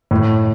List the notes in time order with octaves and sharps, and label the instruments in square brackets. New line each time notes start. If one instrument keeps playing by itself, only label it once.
[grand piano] A2